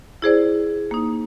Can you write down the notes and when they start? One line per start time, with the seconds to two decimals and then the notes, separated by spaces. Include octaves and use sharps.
0.22 E4 G#4 C5 D5
0.91 A#3 D#4